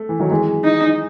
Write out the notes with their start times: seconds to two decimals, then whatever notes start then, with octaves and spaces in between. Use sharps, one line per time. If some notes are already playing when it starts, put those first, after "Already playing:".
Already playing: A3
0.09 E3
0.20 D#3 F#3
0.31 E3 G#3
0.64 D#4